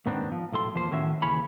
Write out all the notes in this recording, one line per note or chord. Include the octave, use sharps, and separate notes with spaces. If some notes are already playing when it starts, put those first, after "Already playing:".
D#2 G#2 D#3 B3 C4 D4
F3
B1 A2 A4 C6
E2 F3 A#3 C5
A2 D#3 C#4 F#4 E5
D#2 C#3 E3 C#4 C#5 B5